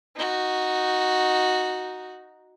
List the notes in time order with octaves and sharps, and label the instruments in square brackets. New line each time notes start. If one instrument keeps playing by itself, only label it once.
[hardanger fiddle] D#4 F#4